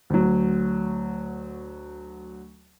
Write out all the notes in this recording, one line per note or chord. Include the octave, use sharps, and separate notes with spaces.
D2 F#3